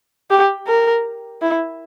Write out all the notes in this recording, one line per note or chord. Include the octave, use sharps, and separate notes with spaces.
G4
A#4
E4